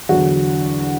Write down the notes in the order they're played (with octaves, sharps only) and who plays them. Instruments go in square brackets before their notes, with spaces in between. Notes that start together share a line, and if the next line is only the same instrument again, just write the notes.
[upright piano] E2 D3 F#3 F#4